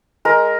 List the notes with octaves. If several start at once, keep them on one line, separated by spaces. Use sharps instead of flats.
G#3 A#4